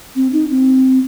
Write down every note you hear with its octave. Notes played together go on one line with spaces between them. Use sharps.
C4
D#4
C4